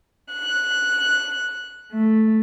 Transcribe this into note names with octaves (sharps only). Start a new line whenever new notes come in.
F#6
A3